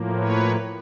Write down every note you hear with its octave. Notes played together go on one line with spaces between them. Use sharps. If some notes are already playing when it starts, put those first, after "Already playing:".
Already playing: A2 F3 A#3
B4 C#5